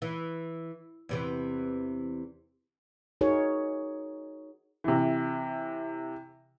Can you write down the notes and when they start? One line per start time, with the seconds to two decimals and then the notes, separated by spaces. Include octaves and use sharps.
0.02 E3
1.09 E2 C3 E3
3.21 D#4 F#4 G#4 A#4 C#5
4.84 C3 E3